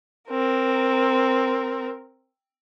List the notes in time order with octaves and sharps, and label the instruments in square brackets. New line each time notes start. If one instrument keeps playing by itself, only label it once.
[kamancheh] C4 A#4